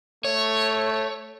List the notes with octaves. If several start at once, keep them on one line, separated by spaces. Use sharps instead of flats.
A3 C#5